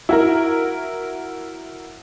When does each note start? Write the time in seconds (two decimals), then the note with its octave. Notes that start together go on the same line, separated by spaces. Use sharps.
0.09 E4 F#4 A#4